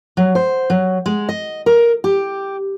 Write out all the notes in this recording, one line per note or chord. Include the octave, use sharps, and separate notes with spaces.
F#3
C5
F#3
G#3
D#5
A#4
G4